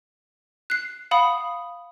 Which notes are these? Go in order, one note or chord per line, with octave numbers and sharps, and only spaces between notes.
F#6 C7
F5 F#5 B5 D#6